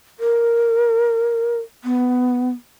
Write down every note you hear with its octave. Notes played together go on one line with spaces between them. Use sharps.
A#4
B3